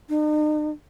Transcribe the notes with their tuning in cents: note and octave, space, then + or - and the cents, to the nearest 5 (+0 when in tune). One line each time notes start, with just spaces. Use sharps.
D#4 -45